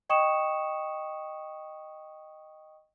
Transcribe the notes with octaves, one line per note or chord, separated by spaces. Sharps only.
D#5 G5 C#6 D#6 C#7 E7